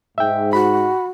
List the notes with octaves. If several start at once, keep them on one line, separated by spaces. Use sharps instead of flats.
G#2 E5 G5
F#4 B5